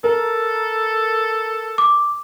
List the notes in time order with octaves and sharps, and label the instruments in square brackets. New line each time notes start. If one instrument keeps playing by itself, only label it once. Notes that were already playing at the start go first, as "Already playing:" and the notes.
[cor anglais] A4 [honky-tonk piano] A#4
[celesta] D6